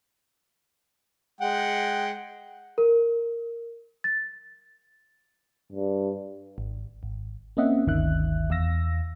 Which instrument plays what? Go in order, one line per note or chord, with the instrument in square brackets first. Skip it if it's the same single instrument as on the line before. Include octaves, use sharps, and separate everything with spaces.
[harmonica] G#3 F#5 G5
[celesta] A#4
A6
[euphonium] G2
[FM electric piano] G#1
G#1
A#3 C4 C#4 D#5 E5 F#5
G1 D2 D#3 E5 F#6
E2 F5 E6 A#6